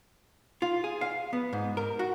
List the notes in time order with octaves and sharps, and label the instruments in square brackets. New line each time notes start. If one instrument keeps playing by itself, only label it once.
[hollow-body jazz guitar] F4
G#4
F5
B3
G#2
A#4
F#4